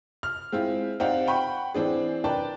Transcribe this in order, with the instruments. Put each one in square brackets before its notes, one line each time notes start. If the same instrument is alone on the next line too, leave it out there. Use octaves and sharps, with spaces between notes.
[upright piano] F6
G#3 C4 E4 F4
C4 D#4 G4 D5 F5 F#5
F#5 G5 B5 C#6
E3 C4 D4 G#4
D4 A#4 B4 D5 G5 A5